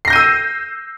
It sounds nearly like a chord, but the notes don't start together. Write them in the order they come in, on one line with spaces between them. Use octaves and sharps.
C7 A#6 G6 D#7 E6